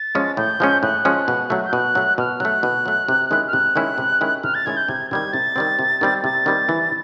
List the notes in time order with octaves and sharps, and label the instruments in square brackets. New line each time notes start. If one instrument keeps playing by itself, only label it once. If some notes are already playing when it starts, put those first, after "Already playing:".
Already playing: [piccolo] A6
[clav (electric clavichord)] F3 G#3 C#4
[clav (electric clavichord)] A2 [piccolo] G6
[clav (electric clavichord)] F3 G#3 C#4
[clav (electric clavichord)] A2 [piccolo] F#6
[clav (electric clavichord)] F3 G#3 C#4
B2
F#3 A3
[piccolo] G6
[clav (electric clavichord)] B2 [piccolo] F#6
[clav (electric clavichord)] F#3 A3
[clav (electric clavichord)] B2 [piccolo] F6
[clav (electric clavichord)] F#3 A3 [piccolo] F#6
[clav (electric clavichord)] B2
F#3 A3
C3
D#3 G#3 C#4 E4
[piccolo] F6
[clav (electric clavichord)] C3 [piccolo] F#6
[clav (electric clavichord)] D#3 G#3 C#4 E4
C3
D#3 G#3 C#4 E4
[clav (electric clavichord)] C3 [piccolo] F6
[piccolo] A6
[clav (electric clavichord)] D#3 G#3 C#4 E4 [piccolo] G#6
[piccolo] G6
[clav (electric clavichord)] C3 [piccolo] G#6
[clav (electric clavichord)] D#3 G3 C4 [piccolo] G#6
[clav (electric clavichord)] C3 [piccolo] A6
[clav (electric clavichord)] D#3 G3 C4
C3
D#3 G3 C4
[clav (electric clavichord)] C3 [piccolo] A6
[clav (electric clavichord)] D#3 G3 C4
E3